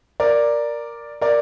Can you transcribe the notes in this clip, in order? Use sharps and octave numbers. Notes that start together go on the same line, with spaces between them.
A#4 D5
A#4 D5